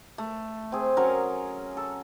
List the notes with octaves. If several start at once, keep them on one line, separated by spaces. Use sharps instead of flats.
A3
C4 G#4
F#3 C#4 A#4
A4